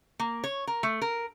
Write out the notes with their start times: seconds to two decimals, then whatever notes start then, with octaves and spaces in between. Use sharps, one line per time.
0.19 A#3
0.44 C#5
0.67 A#4
0.83 A3
1.02 A#4